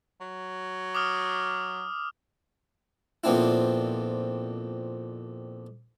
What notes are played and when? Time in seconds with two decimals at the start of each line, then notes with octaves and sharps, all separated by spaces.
0.21 F#3
0.95 D6 D#6 F6
3.24 F2 A#2 B3 C4 D4 E4